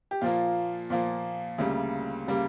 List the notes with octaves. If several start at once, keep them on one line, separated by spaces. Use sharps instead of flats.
G4
A#2 F3 A#3 F4
A#2 F3 A#3
D2 C#3 G3 A#3
C#3 G3 A#3